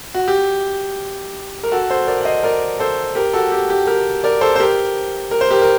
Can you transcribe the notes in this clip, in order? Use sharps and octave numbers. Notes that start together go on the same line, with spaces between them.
F#4
G4
A#4
F#4 A4
A4 C5
A#4 D5
F#5
C5 D#5
A#4 D5
A4 C5
G4 A#4
F#4 A4
G4
G4
G4 A#4
A#4 D5
A4 C5
C5
G4 A#4
A#4
C5
G4 A#4
A#4